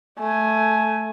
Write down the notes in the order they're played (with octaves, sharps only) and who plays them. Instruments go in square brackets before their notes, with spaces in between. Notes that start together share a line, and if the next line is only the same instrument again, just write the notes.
[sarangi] A3 [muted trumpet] G#5